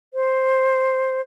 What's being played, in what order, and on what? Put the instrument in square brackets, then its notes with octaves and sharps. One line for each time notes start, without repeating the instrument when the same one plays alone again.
[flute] C5